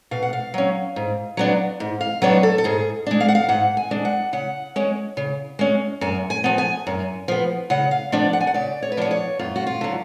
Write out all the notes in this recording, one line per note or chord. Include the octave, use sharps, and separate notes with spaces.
B2 F5
F#5
F5
F#3 C#4
G#2
F#3 B3 D4
G#2
F5
F#3 B3 D4 C#5
A4
A4
G#2 G#4
G#3 D4
F5
F#5
F5
G#2 F#5
G#5
G#3 D4
F#5
C#3 F#5
G#3 C#4
C#3
G#3 C#4
F#2 G#5
G#5
F3 B3
G#5
F#2
F3 B3
C#3 F#5
F5
F3 B3 D4 D5
F#5
G#5
F#5
C#3 D5
C#5
B4
F3 B3 D4 C#5
C#5
F#2 F4
F#4
F4
D3 F#3